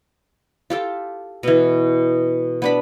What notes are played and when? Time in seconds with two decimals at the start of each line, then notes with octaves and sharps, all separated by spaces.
0.70 F4 G4 A4
1.43 B2 E3
2.62 B3 D4 B5